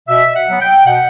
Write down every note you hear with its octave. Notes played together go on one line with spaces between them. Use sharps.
B2 E5
F#5
F#3 B3
G5
B2 F#5